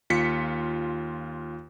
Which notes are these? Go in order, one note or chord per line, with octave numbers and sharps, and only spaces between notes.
D#2 F4 B6 C#7